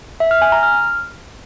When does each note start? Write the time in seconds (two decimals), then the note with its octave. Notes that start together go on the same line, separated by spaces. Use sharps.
0.20 E5
0.31 F6
0.42 G#5
0.52 A#5
0.63 F6